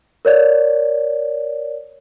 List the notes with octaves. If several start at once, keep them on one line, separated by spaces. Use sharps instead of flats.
A#4 C#5 D5